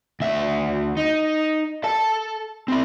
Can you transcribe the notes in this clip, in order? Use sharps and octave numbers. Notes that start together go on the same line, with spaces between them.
D2 E5
D#4
A4 A5
C4 E4